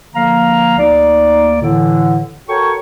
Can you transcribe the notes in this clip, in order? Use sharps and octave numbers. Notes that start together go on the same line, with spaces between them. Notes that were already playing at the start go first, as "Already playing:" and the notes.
D3 F3 A#3 F5 A#5
D2 A#3 D#4 D5
A2 D3 E3
F#4 A4 A#4 C#5 G5 C#6